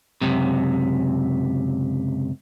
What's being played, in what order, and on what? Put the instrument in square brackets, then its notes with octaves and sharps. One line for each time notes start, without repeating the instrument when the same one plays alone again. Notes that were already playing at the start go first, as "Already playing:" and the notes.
[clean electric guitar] C#2 F#2 C3